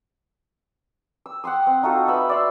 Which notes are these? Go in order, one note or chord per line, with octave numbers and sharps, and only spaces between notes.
E6
F#5 G5 C6 D#6
C4
D#4 F4 F#4 A4
B3 E5 B5
D5 E5 C6